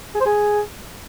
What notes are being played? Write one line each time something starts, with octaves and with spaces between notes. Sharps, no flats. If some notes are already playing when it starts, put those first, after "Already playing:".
G#4
C5
G#4